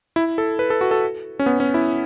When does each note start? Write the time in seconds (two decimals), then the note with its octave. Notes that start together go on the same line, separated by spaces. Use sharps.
0.16 E4
0.38 A4
0.59 B4
0.70 A4
0.81 F#4
0.91 A4
1.39 C#4
1.46 B3
1.60 C#4
1.74 E4